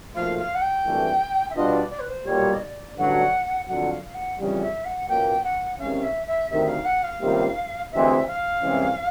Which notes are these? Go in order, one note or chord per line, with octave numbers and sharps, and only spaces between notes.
B1 A#2 F3 A3 F5
F5
F#5
G5
G#1 G2 E3 A3
E5
B2 G3 B3 D4 F4 D#5
D5
D5
B4
C5
B1 A#2 G3 C#5
D#5
D5
A1 G2 D3 F#3 F#5
F2 D3 F#3 F#5
F5
F#5
F2 C#3 E3 G3
E5
F#5
C#2 B2 F#3 A#3 G5
F#5
E2 C3 D#3 G#3 C#4 F5
E5
E5
D2 C3 D#3 E5
F5
F#5
F5
C#2 C3 D#3 G3 A#3
D2 C3 E3 G#3 C4 E5
F5
C2 C3 E3 G#3 C#4